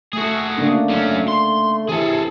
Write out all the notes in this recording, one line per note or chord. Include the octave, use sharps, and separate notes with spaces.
A3 F#4 G#4 A4
C#3 A3 A#3 D4
F#3 C#4
C6
C3 E3 G#4 A4